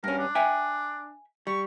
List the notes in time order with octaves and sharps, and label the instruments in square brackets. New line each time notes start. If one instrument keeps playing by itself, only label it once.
[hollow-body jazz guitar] G2 C#4 [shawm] A#4
[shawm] D4
[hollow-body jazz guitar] E5 G5 G#5
[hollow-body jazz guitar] G3 [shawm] C#6